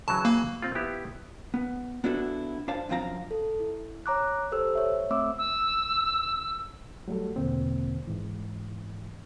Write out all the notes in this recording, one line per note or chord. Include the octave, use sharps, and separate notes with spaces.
C#3 E3 F#3 A5
A#3
C4 F4
B3 E4 G4
B3
B3 D4 E4 F#4 A4
D4 C5 F5 A5
F#2 F3 C4 F5 A#5
A4
E4
C#5 A#5 D6 F#6
G4 A4 C5 E6
C#5 E5
A3 C4 E5 D6 E6
E6
F#3 G3 A3 F#4 A4
E2 B2 D3 A#3 C4
G#2 E3